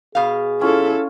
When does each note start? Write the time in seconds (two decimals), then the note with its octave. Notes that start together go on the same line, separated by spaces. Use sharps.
0.15 B2 G#4 F5
0.61 C#4 E4 F4 A4